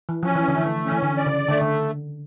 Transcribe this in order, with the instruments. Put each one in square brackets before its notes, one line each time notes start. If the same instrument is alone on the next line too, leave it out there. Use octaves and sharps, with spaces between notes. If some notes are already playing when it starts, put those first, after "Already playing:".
[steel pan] E3
[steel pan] F3 [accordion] C#4
[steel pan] E3
D3
[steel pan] E3 [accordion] A3
[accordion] C#4
[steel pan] E3
D3
[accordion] D5
[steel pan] C#3
[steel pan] D3 [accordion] A3
[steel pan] D3